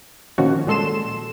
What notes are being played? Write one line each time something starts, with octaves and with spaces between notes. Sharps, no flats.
A#2 D#3 F3 C#4 F#4
A#2 G#3 A4 C6 E7